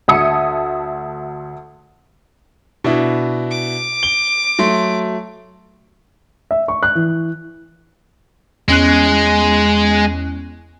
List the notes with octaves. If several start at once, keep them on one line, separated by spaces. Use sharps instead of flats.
D2 E5 A5 D#6 G#6 C#7
B2 D4 E4
D6
G7
F#3 A3 C6
E5
C#6
F#6
E3
E2 G#3 C#4 F#6